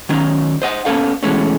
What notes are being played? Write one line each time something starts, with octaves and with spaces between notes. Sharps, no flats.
D#3 F#3 C#4 D#4
C5 D#5 F#5
A#3 B3 C#4 A4 F5
B2 E3 G#3 A3 C#4